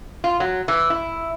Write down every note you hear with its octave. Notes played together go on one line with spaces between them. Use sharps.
F4
F#3
E3
E4